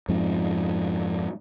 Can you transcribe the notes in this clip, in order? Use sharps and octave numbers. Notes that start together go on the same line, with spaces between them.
F2 G#2 F3